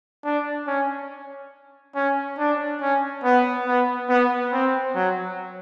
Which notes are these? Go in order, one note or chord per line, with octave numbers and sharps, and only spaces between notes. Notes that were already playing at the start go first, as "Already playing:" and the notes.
D4
C#4
C#4
D4
C#4
B3
B3
B3
C4
F#3